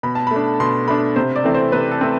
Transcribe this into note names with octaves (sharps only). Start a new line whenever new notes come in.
B2 B5
A5
A3 B5
D4
B2 C6
A3 D4 B5
C3 C5
D5
E3 A3 C4
C5
C3 B4
A4
A3 C4